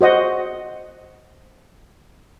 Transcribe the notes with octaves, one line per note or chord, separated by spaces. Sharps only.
F#4 C5 D#5 F#5